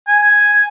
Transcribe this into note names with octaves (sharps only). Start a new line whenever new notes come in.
G#5